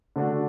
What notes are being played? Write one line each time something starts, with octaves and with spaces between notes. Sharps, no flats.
D3 A3 D4 F#4